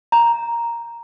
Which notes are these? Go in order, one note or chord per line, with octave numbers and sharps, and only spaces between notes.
A#5